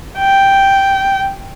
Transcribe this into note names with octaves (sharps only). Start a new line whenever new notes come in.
G5